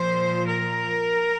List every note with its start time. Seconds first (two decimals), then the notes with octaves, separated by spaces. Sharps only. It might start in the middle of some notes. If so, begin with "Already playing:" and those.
Already playing: A#2 F3 C5
0.45 A#4